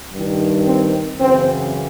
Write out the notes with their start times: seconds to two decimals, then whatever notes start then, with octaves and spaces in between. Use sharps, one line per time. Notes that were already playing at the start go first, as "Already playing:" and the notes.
0.12 G2 D#3
0.66 C4
1.19 F#2 C#3 E3 C4